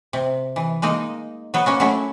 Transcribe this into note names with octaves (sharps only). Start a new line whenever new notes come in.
C3
E3
G#3 A#3 D#4
F#3 B3
A#3 C#4 F#4
F#3 A3 C#4 E4